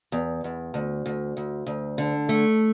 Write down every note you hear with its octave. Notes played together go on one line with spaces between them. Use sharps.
E2
E2
D2
D2
D2
D2
D3
A3